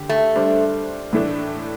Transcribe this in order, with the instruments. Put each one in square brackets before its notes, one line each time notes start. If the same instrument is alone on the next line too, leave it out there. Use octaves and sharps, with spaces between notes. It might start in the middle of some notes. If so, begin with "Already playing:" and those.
Already playing: [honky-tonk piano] D3 G4
[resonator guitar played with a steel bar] A3
[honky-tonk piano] G3 D4 C5
A2 E3 A3 D4